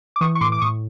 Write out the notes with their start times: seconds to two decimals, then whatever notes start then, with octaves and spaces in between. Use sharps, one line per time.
0.16 D6
0.21 E3 C#6 D#6
0.35 C#6
0.41 A2 C6 D6
0.52 D6
0.61 A2 C#6 D#6